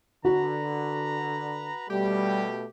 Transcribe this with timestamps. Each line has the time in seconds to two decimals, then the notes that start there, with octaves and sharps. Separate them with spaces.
0.25 D3 F#4 B4 A#5
1.89 B2 G3 A3 G4